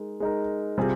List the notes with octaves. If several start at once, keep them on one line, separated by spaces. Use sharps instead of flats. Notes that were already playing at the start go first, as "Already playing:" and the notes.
Already playing: G#3 D#4 A#4
G#3 D#4 A#4
C3 G3 C4 F4 G#4